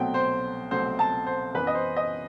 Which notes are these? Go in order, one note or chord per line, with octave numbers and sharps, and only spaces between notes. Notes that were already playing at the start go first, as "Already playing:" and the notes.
Already playing: C2 B2 F#3 A3 C4 G5
C5
C2 B2 F#3 A3 C4 C5
A5
C5
F#2 E3 B3 B4
D#5
C5
D#5